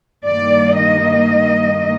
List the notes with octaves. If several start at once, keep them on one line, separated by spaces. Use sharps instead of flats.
G2 D#3 G3 A#3 D5
D#5